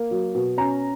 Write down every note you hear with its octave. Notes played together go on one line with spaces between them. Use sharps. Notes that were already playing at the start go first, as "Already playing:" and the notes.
Already playing: A#3
F#3
B2
C#4 A#5